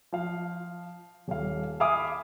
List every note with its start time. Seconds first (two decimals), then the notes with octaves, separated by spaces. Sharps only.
0.12 F3 F5
1.28 D#1 F5
1.80 E5 F5 G#5 B5 D6 D#6